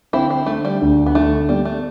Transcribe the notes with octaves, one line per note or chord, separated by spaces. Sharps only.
D3 C4 E4
C4
D3 A3
G3
D2
B3
D3 A3
G3 B3
A3